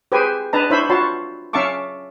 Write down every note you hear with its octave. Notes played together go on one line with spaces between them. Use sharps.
G4 G#4 B4 C5 G5 G#5
D4 B4 D#5 A5 A#5
D4 E4 C5 C#5 E5 B5
F4 F#4 C#5 A5 C6
C#4 E5 F5 A5 C#6 D6